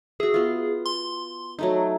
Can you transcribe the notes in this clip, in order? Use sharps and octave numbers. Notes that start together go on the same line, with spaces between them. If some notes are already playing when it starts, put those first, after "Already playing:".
F#4 G#4 E5
B3 F4
C6
F#3 A3 D#4